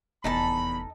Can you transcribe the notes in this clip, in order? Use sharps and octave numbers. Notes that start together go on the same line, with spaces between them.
F1 E2 D#4 A4 A5 B5